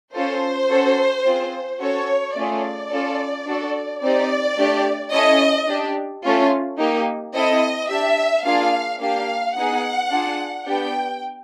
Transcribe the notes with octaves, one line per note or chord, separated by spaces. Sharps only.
C#4 F4 A4 C5
C#4 F#4 A4
C4 F4 G#4
C#4 F#4 A4 C#5
A3 C#4 F4 G#4 D5
C#4 F4 A4
D4 F#4 A4
C4 D#4 G4 D5
A3 D4 G4
C#4 E4 A4 D#5
D4 G4
A3 C#4 F4
A#3 D#4 G4
C4 E4 A4 D#5
D4 G4 E5
A#3 D4 F4 G#4 F5
A#3 D4 G4 F5
B3 D#4 G#4 F#5
D4 F4 G#4
B3 D4 G4 G5